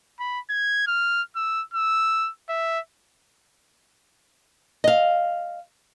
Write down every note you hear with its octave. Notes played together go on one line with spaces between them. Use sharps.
B5
G#6
F6
E6
E6
E5
D#5 F5